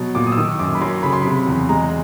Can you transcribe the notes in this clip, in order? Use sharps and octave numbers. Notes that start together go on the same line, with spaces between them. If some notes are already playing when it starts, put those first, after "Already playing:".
Already playing: B2 F#3
A#2 D6
D#6
E6
D#3 D#6
F#2 D6
B5
F#3 C6
C#3 B5
C6
C3 B5
E2
G#3 A#5